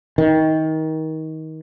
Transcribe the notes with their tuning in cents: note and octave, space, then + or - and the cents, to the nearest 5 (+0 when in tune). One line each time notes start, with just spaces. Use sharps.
D#3 +25